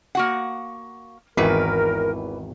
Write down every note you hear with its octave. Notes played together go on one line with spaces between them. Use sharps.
A#3 F#4 F#5
G#1 E2 D#3 E3 A#4 B4